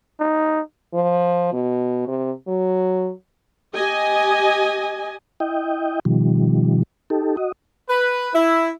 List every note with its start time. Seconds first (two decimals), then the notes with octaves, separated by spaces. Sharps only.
0.20 D#4
0.94 F3
1.53 B2
2.08 C3
2.48 F#3
3.74 G4 D#5 G#5
5.40 E4 D#5 G5
6.05 B2 D#3 F3 G3
7.10 D#4 G4 A4
7.37 F#4 D#5
7.89 B4
8.34 E4